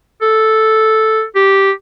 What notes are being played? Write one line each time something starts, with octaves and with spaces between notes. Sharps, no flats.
A4
G4